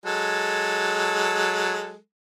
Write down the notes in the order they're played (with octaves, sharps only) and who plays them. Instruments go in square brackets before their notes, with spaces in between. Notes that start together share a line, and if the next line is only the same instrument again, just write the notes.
[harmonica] F#3 G#3 A4